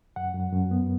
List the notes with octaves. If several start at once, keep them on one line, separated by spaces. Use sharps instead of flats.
F#2 F#5
F#2
F#2
B3